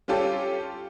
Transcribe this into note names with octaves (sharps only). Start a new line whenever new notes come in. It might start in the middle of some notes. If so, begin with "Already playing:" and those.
G3 C#4 F4 G4 A4